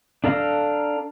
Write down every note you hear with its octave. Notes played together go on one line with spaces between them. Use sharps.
D4 A4 F5 A#5